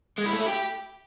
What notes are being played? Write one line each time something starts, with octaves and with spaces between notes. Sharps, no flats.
G#3
E4
A3
E4
G4